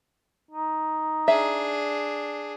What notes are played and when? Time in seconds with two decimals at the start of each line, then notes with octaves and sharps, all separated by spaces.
0.51 D#4
1.28 D4 G#4 E5